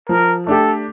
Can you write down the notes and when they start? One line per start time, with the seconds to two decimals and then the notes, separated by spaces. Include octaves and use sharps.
0.09 F3 A#4
0.47 A3 D4 G4 A4